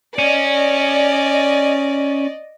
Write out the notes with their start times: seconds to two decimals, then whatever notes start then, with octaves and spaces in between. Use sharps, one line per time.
0.19 C#4 D5 D#5